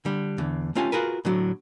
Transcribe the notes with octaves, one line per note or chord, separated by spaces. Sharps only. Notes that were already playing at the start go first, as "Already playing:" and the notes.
D3 G3
E2 D3
A3 C#4 F4 G4 G#5
F4 F#4 G#4 A#4 B4
A2 D3 F#3